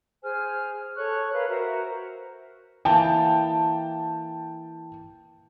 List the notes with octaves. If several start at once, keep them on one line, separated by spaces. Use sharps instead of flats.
G#4 C5 G#5 F6
A4 C#5 C#6 F#6
A#4 B4 F5
F#4 A#4 C5 E5
E3 A#3 G5 A5